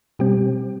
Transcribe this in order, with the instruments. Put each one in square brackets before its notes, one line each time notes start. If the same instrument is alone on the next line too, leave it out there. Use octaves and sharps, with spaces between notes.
[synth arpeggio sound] B2 G3 C4 G4